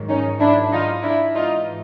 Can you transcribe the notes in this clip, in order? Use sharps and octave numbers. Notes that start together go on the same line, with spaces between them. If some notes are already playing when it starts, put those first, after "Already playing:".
Already playing: G#2 D#3 F#3
C#4 D#4
D4 E4
D#4 F4
D4 E4
G#2 E3 D#4 F4